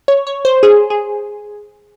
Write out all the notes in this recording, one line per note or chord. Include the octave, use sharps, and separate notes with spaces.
C#5
C#5
C5
G#4
G#4